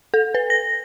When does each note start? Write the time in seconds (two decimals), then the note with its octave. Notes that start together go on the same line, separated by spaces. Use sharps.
0.14 A4
0.34 B4
0.50 A#6